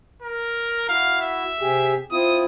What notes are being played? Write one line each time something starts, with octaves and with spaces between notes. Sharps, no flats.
A#4
E4 F#4 F5
E5
C3 G4 G#4
C4 E4 F4 D#6